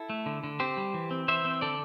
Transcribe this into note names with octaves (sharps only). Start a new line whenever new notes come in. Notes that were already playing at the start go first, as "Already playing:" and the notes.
Already playing: E4 A4
A3
D3
D3
C4 G4 C5
G3
E3
C4
E3 C5 E5
C4
D3 A4 D5